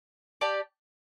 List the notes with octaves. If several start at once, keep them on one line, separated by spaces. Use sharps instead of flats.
G4 D5 A5